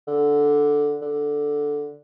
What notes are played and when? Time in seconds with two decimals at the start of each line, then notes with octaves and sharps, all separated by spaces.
0.08 D3
1.02 D3